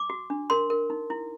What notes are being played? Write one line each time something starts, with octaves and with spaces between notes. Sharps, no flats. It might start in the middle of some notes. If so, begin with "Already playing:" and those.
Already playing: D6
F#4
D4
A#4 C6
A#4
D#4
E4